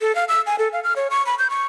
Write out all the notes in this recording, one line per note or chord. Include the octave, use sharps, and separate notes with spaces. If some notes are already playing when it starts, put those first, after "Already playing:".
A4
F5
E6
G#5
A4
F5
F6
C#5
C#6
B5
G6
C#6